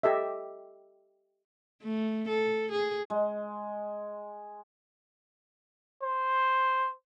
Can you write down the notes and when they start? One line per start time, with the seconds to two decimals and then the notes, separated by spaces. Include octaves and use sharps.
0.03 G4 A4 D#5 E5
1.83 A3
2.28 A4
2.71 G#4
3.10 G#3
6.03 C5